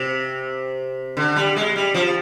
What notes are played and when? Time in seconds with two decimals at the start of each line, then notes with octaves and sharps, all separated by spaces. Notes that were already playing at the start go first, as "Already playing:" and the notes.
Already playing: C3
1.17 D3
1.36 G3
1.56 G#3
1.76 G3
1.94 F3